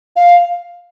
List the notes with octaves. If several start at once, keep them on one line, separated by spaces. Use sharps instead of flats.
F5